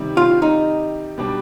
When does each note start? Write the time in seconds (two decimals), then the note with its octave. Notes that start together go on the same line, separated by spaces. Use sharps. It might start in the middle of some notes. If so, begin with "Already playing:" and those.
Already playing: C3 D#3 G3
0.17 F4
0.42 D#4
1.18 B2 G3 D4